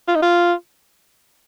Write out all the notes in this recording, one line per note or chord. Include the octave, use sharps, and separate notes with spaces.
F4
D#4
F4